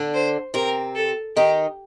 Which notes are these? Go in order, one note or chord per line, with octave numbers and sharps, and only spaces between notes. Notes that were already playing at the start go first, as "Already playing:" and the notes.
Already playing: D3 D4
C5
C3 C4 A#4
A4
D#3 D#4 G4